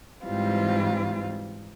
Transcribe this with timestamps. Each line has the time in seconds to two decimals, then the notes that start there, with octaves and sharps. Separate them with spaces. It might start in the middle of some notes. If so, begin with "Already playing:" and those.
0.23 G#2 E3 G3 C4 F4